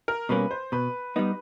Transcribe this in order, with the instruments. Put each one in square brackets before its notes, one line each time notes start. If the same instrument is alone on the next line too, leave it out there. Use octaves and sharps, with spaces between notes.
[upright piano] A#4
[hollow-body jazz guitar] B2 G3 A#3 C#4 [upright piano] B4
[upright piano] C5
[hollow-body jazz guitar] B2 [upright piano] B4
[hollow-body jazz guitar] G3 B3 D#4